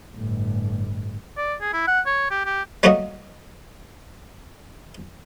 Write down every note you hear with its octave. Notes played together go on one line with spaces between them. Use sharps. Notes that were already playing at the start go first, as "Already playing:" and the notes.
G1 A2
D5
G#4
E4
F#5
C#5
G4
G4
G3 A3 A#3 C#4 F#4 D#5